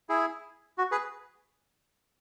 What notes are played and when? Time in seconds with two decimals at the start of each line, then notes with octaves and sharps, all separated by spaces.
0.09 E4 G#4
0.78 F#4
0.91 G#4 B4